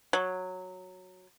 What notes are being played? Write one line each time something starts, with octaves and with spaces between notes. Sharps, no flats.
F#3